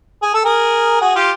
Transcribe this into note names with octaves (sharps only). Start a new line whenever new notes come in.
G#4
A4
G#4 A#4
F#4 G#4
F4 G4